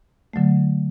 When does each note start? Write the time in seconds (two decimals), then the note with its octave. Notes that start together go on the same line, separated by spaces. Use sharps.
0.33 D3 F#3 A3